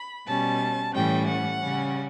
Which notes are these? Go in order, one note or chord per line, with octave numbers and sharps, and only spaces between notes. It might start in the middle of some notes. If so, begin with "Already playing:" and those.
Already playing: B5
B2 G3 C#4 A5
A2 E3 G3 C#4 G5
F#5
C#3 G3 C#4